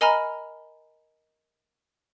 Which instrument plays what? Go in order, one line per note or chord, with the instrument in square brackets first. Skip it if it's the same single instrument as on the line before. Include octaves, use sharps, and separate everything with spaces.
[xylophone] A#4 D#5 G#5 A#5 B5 F6